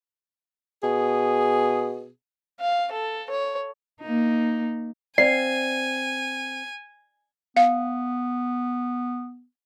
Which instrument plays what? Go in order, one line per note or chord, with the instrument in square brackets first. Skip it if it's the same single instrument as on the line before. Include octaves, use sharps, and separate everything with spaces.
[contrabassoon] B2 [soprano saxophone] G#4
[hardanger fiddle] F5
A4
C#5
[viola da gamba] A#3 D#4
[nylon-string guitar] C4 F5 [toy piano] D5 [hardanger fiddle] G#5 [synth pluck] C7
[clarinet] B3 [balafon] F5